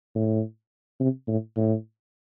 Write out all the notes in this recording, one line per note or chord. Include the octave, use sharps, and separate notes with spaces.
A2
C3
A2
A2